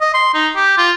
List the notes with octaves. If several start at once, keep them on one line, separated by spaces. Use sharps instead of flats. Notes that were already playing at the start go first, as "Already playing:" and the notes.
D#5
C6
D#4
G4
F4